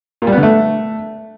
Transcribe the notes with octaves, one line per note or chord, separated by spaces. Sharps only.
A#2
G3
B3
D3
A3